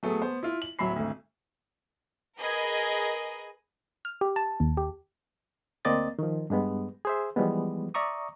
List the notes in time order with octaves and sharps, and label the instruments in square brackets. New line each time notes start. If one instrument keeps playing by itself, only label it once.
[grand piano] F#3 A3 B3 G#4
B3 C5
E4 F4
F#7
D1 F#3 E5 B5 C7
G#1 D2
[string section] G#4 A#4 B4 D#5 G#5
[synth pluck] F6
G4
A5
D#2
G4
[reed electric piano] D2 A#3 C4 D5 D#5 A6
D#3 F3
G2 G#3 B3
G#4 C5 E5
E3 F3 G3 G#3 B3
D5 E5 A#5 C#6 D#6